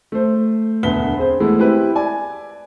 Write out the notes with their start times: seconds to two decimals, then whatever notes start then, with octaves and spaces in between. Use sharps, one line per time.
0.12 A3 C5
0.83 E1 D2 B3 B6 G7
1.17 C4 G#4 C5
1.40 E3 G#3 A3 B3 E4
1.59 C4 E4 G4 B4
1.95 D5 G#5